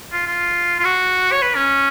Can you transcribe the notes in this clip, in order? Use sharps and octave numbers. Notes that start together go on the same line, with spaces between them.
F4
F4
F4
F#4
C#5
B4
C#4